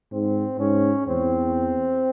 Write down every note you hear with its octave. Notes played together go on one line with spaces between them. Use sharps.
G#2 C4
G#2 C#4
E2 C4